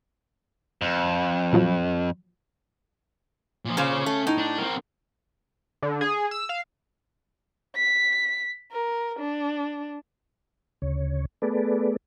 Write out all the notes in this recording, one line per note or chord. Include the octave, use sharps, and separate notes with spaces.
F2
A#2 F3 F#3
A#2 F3
A#2 C#3 C#4 C5 F5
A3
A2 D#4
D4
C4 A#4
D3
G#4
E6
F5
B6
A#4
D4
D2 C#3 C#5
A3 B3 G#4 A4 B4 D5